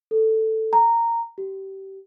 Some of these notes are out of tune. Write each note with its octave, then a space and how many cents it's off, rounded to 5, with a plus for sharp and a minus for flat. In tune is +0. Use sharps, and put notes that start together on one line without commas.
A4 +5
A#5 -10
G4 -25